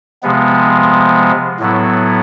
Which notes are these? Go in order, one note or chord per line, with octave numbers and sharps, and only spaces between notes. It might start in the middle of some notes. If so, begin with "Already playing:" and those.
C3 F3 G#3 B3
A2 F#3 B3 E4